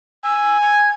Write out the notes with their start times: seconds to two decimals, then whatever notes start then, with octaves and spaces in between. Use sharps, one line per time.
0.24 G#5 E6
0.62 G#6